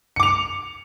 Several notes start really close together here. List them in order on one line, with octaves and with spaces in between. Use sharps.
C#7 D6 F7